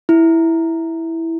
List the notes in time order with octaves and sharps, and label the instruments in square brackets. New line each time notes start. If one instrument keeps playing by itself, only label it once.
[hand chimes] E4